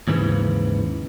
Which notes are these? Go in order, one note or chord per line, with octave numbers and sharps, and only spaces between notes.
D#2 G#2 C#3 E3